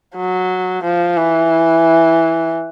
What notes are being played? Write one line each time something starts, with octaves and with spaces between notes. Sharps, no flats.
F#3
F3
E3